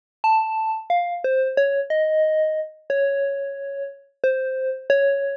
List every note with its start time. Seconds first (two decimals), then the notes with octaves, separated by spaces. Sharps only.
0.24 A5
0.90 F5
1.24 C5
1.57 C#5
1.90 D#5
2.90 C#5
4.24 C5
4.90 C#5